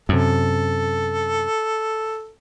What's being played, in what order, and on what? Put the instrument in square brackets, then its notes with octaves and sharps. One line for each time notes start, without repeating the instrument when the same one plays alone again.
[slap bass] F#2 C3 [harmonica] A4